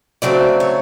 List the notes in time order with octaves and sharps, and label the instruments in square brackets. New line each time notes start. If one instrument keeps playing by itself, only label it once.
[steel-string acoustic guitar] C#3 F#3 A3 C4 D5
C#5